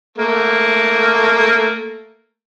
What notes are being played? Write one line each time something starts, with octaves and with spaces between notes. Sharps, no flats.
A3 A#3